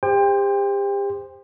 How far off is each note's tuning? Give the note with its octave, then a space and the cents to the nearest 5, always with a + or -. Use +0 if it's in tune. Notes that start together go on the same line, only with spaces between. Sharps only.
G4 +35 C5 +0 G5 +30